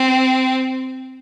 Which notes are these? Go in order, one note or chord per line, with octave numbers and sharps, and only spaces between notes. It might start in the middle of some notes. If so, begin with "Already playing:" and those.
Already playing: C4